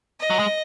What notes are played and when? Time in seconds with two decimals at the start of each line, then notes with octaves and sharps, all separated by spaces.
0.20 D#5
0.30 F#3
0.39 G#3